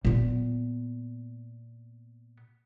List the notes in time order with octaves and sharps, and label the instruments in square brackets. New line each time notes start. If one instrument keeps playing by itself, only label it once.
[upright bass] A#2 B3